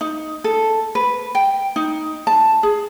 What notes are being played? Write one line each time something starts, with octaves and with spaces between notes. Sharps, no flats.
D#4
A4
B4
G5
D#4
A5
G#4